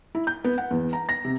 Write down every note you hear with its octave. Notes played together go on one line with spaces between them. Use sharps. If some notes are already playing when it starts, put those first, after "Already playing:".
E4
G6
B3
F#5
E2
A#5
A#6
C3